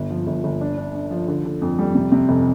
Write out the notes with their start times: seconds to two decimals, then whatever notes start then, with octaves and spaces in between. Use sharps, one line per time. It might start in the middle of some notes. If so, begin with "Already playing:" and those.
Already playing: G1
0.10 F3
0.27 G1
0.44 G1
0.61 D4
0.77 D4
0.94 D4
1.11 F3
1.28 D3
1.45 D3
1.62 F2
1.79 G3
1.95 C3
2.12 C3
2.29 F1